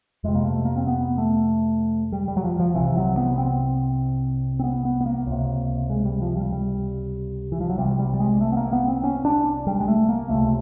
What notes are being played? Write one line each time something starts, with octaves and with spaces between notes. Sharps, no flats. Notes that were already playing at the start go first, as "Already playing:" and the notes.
F2 C3 G#3
A#3
A3
A#3
C4
B3
A3
G3
G3
F#3
F3
F3
C2 C3 E3
F#3
B3
C4
C4
B3
B3
B3
A#3
C#2 C3
G#3
G3
F3
G3
G3
E3
F3
F#3
C2 C3 G3
G3
G3
G#3
A3
B3
A#3
B3
C4
C#4
D4
G3
G#3
A3
A#3
C#2 C3 A3